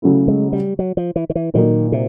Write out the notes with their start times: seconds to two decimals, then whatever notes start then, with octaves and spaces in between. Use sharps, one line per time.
0.02 C#3 F#3 A3 C#4 E4
0.28 G#3
0.53 G3
0.79 F#3
0.97 F3
1.16 E3
1.30 D#3
1.35 E3
1.54 A#2 D#3 F#3 A#3 D#4
1.92 C3